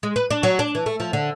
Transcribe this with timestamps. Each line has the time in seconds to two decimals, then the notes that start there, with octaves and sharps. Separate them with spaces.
0.03 G#3
0.16 B4
0.31 D4
0.43 F#3
0.59 D4
0.75 E3
0.86 A3
1.00 F3
1.13 D3